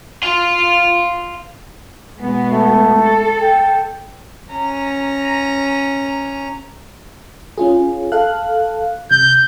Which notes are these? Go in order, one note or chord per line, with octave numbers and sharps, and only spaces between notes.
F5 C6
B2 G#3 B3
A3
A4
G5
C#4 A#5
C#4 F4 G#4
A4 F5 F#6
C3 G6